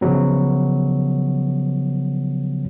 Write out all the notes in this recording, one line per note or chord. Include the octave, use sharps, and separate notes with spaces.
C#3 F3 F#3 B3